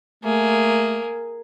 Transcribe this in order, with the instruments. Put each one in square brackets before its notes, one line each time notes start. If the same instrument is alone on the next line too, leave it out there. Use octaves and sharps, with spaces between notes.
[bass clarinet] A3 [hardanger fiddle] A#3 G#4